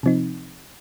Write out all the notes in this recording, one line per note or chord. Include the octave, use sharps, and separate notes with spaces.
C3 F3 C4 D#4